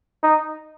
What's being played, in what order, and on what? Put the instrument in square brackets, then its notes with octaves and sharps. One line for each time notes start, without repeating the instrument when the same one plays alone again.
[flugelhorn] D#4